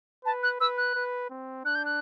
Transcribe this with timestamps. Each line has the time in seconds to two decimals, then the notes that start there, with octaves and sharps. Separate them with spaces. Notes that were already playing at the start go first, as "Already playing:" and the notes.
0.24 B4 A5
0.43 F#6
0.60 B4 E6
0.77 F#6
0.95 B4
1.30 C4
1.65 D4 F#6
1.75 G6
1.85 F#6